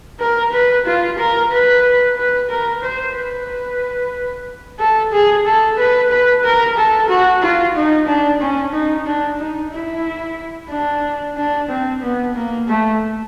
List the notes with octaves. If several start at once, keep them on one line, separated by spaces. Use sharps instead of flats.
A#4
B4
F4
A#4
B4
B4
A#4
C5
B4
A4
G#4
A4
B4
B4
A#4
A4
F#4
F4
D#4
D4
C#4
D#4
D4
D#4
E4
D4
D4
C4
B3
A#3
A3